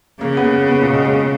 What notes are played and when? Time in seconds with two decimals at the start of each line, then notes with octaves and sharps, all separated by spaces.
0.20 C#3 A#3
0.37 B3
0.44 A#3
0.68 B3
0.82 A#2
0.92 B2
1.05 G#3